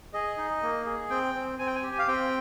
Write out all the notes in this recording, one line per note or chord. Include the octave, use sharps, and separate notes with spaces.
G#4 D#5
D#4
A#3
G#4
C4 G5
C4
C4 G#5
G5
G#5
G4
F5
C4 G5